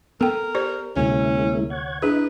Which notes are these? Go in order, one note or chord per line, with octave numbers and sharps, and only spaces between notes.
B3 A4 A#4 G5
G4 C5 D5
D2 C3 G#3 A#3 C#4 E4
C#5 F#5 G#6
D4 E4 G#4 B4 D#5